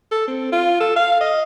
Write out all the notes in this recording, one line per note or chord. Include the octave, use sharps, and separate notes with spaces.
A4
C4
F4
A4
F5
D#5